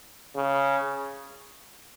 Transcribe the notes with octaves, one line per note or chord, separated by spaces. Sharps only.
C#3